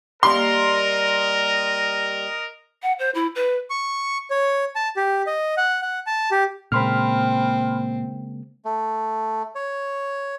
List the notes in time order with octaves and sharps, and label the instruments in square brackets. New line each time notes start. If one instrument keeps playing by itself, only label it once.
[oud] G3 A#3 F5 [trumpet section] A#4 D#5 [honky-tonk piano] C6
[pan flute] F#5
C5
E4
B4
[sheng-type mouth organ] C#6
C#5
A5
G4
D#5
F#5
F#5
A5
G4
[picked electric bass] A#2 [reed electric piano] C#3 G#3 A#3 [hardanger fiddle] C4 [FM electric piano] B5 C6 F6
[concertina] A3
C#5